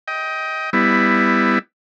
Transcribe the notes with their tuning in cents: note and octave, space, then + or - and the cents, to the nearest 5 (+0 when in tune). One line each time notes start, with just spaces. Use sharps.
D#5 +25 G5 +0
G3 +20 B3 +15 E4 +5